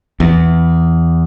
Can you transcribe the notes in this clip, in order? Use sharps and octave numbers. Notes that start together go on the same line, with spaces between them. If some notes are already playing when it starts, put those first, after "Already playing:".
E2